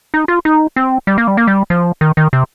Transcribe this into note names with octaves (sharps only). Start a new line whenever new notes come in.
D#4
F4
D#4
C4
G3
A#3
G3
A#3
G3
F3
D#3
D#3
C3